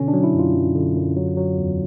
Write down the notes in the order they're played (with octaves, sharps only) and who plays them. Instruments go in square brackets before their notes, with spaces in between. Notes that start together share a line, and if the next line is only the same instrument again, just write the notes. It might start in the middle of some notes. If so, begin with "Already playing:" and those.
Already playing: [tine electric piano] B2 D3 C#4
D4
F#3
E4
F#2
F4
F#2
D3
F#2
F#3
F#3
E2